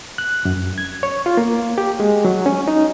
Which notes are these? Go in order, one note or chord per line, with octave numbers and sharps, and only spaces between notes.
F#6
F#2
G#6
C#5
F4
A#3
G4
G#3
F#3
C#4
D#4